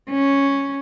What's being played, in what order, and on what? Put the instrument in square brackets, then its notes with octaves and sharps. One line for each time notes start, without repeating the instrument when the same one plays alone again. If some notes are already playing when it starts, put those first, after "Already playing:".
[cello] C#4